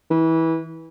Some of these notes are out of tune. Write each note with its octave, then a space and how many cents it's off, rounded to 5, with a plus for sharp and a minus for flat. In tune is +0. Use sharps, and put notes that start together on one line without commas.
E3 -20